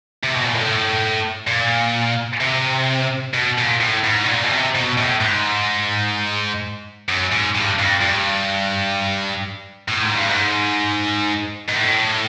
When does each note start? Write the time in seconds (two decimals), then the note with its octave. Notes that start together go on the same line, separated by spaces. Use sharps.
0.24 C3
0.34 B2
0.44 A#2
0.54 A2
1.47 A#2
2.41 C3
3.34 B2
3.58 A#2
3.80 A2
4.04 G#2
4.24 B2
4.28 A#2
4.44 B2
4.51 C3
4.75 B2
4.98 A2
5.21 G#2
7.09 F#2
7.32 G#2
7.55 G2
7.79 F2
8.01 G2
9.88 A2
10.02 G#2
10.16 G2
10.29 G#2
11.69 G#2
11.76 A2